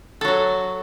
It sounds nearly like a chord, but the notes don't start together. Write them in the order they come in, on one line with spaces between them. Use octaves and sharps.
A4 F#3 F#4